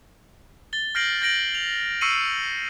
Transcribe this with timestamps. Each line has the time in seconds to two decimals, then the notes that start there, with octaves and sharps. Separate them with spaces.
0.73 A6 G7
0.95 F6 G6 A#6 C7 D7 F#7
1.21 G6 A6 A#6 D7 F#7
1.55 F7
2.01 C#6 E6 C7 C#7 D#7 F#7